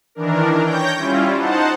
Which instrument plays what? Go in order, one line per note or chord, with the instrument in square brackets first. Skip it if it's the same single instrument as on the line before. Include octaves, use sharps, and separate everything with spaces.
[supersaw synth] D#3 E3 D4 A#4
C#5 G5 G6 A#6
G3 C#4 E4 F4
D#4 C5 F#5 A5